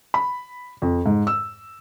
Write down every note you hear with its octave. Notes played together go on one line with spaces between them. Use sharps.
B5
F2
G#2
E6